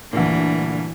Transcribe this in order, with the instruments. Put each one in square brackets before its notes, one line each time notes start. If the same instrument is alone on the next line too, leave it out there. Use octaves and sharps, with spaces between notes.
[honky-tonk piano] D2 G2 A#2 [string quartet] E3